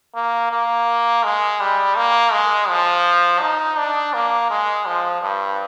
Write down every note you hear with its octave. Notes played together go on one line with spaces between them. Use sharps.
A#3
A#3
G#3
G3
A#3
G#3
F3
D#4
D4
A#3
G#3
F3
G2